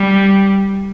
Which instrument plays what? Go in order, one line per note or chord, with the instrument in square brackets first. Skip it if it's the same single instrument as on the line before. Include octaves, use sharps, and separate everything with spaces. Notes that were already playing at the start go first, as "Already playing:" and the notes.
Already playing: [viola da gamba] G3